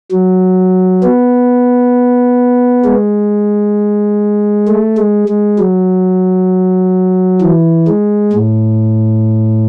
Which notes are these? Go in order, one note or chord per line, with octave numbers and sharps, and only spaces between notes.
F#3
B3
G#3
A3
G#3
G#3
F#3
E3
G#3
A2